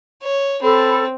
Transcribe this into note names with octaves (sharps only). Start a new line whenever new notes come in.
C#5
C4 A4 B5